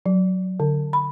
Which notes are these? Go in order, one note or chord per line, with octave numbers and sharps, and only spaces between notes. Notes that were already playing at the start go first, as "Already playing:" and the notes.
F#3
D3
B5